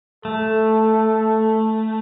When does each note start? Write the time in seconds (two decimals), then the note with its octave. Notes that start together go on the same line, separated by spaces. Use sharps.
0.25 A3 A4